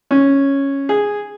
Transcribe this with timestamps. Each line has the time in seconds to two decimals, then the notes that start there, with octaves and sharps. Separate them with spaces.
0.11 C#4
0.89 G#4